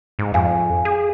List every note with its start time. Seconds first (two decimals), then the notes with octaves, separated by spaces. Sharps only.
0.19 G#2
0.34 F2 F5 G#5
0.85 G#4